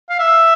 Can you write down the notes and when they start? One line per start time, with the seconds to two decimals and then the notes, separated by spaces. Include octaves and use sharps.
0.09 F5
0.19 E5